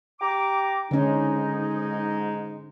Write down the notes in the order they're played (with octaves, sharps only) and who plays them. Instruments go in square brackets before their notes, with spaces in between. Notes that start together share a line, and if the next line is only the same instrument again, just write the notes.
[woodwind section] G4 A#5 D6
[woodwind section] G#2 G#3 D#4 [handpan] D3 C#4